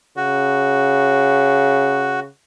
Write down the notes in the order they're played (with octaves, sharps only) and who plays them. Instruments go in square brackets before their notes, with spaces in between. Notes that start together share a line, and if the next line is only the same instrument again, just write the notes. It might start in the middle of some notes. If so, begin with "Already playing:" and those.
[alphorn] C#3 [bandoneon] F#4